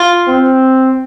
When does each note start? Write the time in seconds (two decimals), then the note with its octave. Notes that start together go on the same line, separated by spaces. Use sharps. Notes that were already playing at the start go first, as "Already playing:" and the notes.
Already playing: F4
0.28 C4